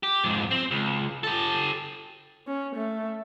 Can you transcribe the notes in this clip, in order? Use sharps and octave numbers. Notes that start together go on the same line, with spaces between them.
G4
F2 G#2
C4
C#2
G4 A4
C#4
A3